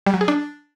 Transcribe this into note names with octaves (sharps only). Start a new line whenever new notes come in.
G3
F#3
G#4
D4